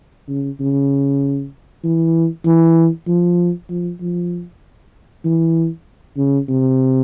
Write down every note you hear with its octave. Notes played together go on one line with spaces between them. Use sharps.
C#3
C#3
E3
E3
F3
F3
F3
E3
C#3
C3